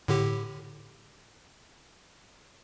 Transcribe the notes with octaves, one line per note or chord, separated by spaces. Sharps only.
A2 D3 G4